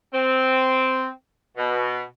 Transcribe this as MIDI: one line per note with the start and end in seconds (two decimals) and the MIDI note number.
0.14 1.09 60
1.57 2.03 47